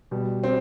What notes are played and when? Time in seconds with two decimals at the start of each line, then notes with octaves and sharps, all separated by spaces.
0.11 B2 G3
0.44 C4